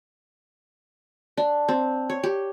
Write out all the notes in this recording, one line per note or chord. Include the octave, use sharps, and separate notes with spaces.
D4
C4
C#5
G4